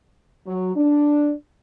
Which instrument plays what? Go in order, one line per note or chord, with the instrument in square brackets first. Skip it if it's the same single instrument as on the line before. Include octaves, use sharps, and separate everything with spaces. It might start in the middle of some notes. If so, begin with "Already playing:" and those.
[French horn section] F#3
D4